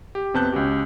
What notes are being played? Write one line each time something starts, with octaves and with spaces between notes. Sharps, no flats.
G4
F2 C3 B3 A5 F#6 G6
C#2 C#4 F#4 G4